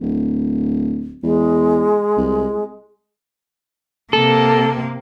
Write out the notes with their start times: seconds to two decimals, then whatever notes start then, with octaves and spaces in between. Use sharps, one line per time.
0.01 D1
1.23 E2 G#3
2.17 C2
4.13 C3 A#3 A4